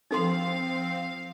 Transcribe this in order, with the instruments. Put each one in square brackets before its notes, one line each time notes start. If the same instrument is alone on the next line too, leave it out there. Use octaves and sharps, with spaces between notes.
[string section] F3 F5 [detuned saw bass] C4 [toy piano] D#4 A4 C6